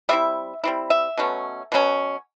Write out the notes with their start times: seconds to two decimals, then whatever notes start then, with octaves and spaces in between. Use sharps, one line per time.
0.09 G3 C4 E4 E5
0.64 G3 C4 E4
0.90 E5
1.17 B2 F#3 A3 C#4
1.72 B2 F#3 A3 C#4